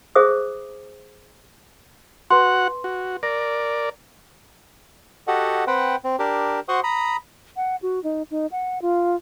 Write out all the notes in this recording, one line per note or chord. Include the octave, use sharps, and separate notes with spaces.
G#4 C5 E5 D6 D#6
F#4 B4 F#5 C6
F#4
A#4 D5 A#6
F#4 G4 A4 D#5 F#5
C4 B4 C5 F#5 G5
C4
D4 G4 A#4
F#4 C5 F#5 C6 C#6 D#6
A#5 B5 D#6
F#5
F#4
D#4
D#4
F#5
F4